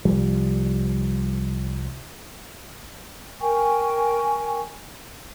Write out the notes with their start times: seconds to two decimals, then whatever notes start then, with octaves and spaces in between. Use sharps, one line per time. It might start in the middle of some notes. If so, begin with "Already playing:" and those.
0.05 C2 F3 G3
3.41 A#4 G5 G#5 C#6